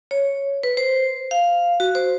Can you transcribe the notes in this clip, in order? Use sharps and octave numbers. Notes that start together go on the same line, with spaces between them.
C#5
B4
C5
F5
F#4
C5